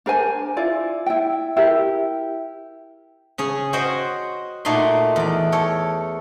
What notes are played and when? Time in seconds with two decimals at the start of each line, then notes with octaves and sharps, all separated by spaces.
0.06 D4 A#4 C5 G#5
0.57 E4 F4 D5
1.06 E4 G5
1.57 E4 G4 A#4
3.38 C#3 C#4 G#4
3.73 F#4 C5 C#5 D#5 F#5 G5
4.65 A#2 A3 D#4 F#4 D5 C6
5.16 E2 D5
5.52 A4 C#5 G5